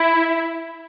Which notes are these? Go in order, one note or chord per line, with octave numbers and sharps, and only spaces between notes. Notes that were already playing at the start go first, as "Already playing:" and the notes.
Already playing: E4